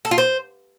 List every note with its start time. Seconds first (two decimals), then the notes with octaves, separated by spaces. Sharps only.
0.05 A4
0.11 F4
0.18 C5